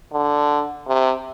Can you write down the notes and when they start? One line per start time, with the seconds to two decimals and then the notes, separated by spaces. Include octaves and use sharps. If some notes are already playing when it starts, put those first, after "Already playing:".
0.13 D3
0.88 C3